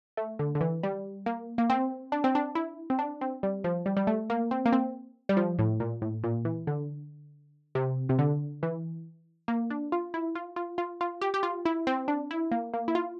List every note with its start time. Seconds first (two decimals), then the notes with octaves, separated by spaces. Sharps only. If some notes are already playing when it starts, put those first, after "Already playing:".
0.17 A3
0.39 D3
0.55 D3
0.61 E3
0.83 G3
1.26 A#3
1.58 A#3
1.70 C4
2.12 D4
2.24 C4
2.35 D4
2.55 E4
2.90 C4
2.99 D4
3.21 C4
3.43 G3
3.64 F3
3.86 G3
3.97 G3
4.07 A3
4.30 A#3
4.51 C4
4.66 A#3
4.73 C4
5.29 G3
5.37 F3
5.59 A2
5.80 A#2
6.02 A2
6.24 A#2
6.45 E3
6.67 D3
7.75 C3
8.09 C3
8.19 D3
8.63 E3
9.48 A#3
9.70 D4
9.92 F4
10.14 E4
10.35 F4
10.56 F4
10.78 F4
11.01 F4
11.21 G4
11.34 G4
11.43 F4
11.65 E4
11.87 C4
12.08 D4
12.31 E4
12.51 A#3
12.74 A#3
12.88 E4
12.95 F4